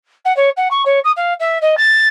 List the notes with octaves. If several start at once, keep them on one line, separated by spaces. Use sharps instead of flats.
F#5
C#5
F#5
C#6
C#5
D#6
F5
E5
D#5
A6